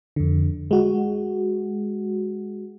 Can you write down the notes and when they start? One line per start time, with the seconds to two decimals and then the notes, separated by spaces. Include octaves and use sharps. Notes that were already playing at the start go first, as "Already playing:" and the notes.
0.16 F2 D3
0.71 G#3 F#4